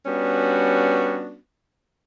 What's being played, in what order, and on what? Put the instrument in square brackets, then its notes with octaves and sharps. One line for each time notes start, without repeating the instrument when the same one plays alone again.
[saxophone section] G3 B3 C#4 D4 F#4